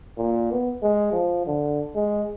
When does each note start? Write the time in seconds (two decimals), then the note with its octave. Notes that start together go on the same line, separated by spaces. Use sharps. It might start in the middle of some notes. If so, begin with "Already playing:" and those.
0.18 A#2
0.52 B3
0.82 G#3
1.13 F3
1.47 D3
1.95 G#3